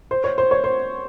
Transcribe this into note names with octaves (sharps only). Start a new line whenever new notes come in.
C5
C#5
C5
C#5
C5